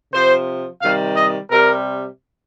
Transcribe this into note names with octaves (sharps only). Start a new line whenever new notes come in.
C3 F3 C5
C3 D#3 G3 F5
D#5
C3 G3 A#4